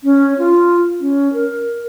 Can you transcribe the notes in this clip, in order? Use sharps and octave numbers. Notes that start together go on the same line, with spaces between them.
C#4
F4
C#4
A#4